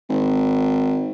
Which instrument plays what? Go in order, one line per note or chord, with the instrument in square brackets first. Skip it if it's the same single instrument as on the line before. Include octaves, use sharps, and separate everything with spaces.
[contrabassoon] G#1